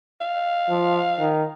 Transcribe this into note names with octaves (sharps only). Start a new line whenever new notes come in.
F5
F3
D#3